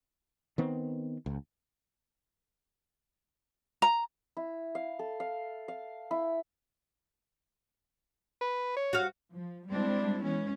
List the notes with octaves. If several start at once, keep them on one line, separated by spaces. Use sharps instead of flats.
D#3 B3 C4
C#2
A#5
E4
F5
A4
F5
F5
E4
B4
C#5
F#4 F5
F3
G3 G#3 C4 D4 E4
E3 G#3 B3 C#4